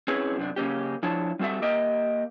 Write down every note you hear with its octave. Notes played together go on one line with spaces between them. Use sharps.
C4 C#4 E4 G#4 B4 C#5
F#2 C3 D4
C#3 A#3 C#4 G4
F3 D4 E4 C#5 A5
G3 C4 F#4 A4 E5
A#3 G4 A#4 D#5 E5 G5